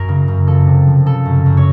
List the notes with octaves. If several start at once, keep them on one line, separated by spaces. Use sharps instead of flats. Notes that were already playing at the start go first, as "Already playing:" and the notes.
Already playing: F#2 A#4
C#3
F#2
F3 A4
C3
F3
C#3 A4
F#2
F#2
C#5